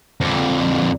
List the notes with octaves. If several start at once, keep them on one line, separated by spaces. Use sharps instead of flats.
F2 D3